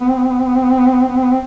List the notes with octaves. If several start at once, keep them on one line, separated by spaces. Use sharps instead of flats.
B3
C4
B3
C4
B3
C4
B3
C4
B3
C4
B3
C4
B3
C4
B3
C4
B3
C4